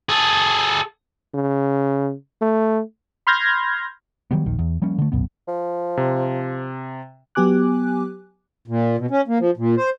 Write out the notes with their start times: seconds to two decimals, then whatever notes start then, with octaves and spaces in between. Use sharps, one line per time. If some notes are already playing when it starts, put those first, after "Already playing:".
0.09 G#4 A4
1.34 C#3
2.42 A3
3.27 B5 C6 F6 G6 G#6 A#6
4.31 D#3 F#3 G3 B3
4.46 A#1 D#2 D#3
4.59 E2
4.82 F3 G3 A#3 C#4
4.98 D3 A3
5.12 D#1 B1 F#2 B3
5.48 F3
5.97 C3
7.35 F#3 B3 G4 G#5 D6 F#6
8.68 A#2
8.98 B2
9.11 C#4
9.28 A#3
9.39 F3
9.57 A#2
9.77 C5